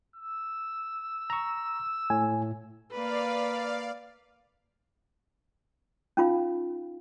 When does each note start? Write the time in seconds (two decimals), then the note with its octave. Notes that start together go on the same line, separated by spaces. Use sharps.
0.16 E6
1.30 A#5 C#6
2.10 A2 G#5
2.91 A#3 B4 D5 F5
6.17 C#4 D#4 F4 F5